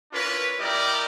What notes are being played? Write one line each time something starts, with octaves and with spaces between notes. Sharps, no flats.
C#4 D4 E4 F4 A#4 B4
G3 E4 G4 A#4 D5 D#5